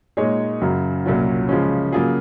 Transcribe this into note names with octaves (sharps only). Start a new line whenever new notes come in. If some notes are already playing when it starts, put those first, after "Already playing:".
A#2 G#3 D#4 G#4 C#5
F#2 C#3 F#3
C2 A#2 F#3 C#4 F4
C#3 F3 G#3 C#4
C#3 F#3 A#3 F4 G#4